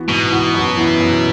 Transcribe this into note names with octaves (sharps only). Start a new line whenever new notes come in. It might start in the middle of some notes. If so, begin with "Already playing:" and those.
Already playing: E3 B3 F#4
G#2 B2
E3 B3 F#4
F#2
E3 B3 E4
F#2